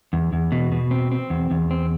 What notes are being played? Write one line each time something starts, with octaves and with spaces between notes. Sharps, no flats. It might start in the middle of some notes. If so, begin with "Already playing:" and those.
E2
E2
B2
B2
C4
C4
E2
E2
C4